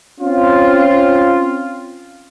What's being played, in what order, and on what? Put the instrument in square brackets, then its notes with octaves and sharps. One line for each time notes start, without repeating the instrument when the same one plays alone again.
[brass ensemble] C4 C#4 F4